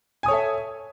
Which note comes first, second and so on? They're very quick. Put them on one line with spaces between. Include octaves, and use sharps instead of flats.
G#5 D#6 C#5 A4 E5